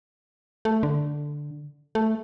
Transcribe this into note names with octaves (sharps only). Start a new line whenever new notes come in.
A3
D3
A3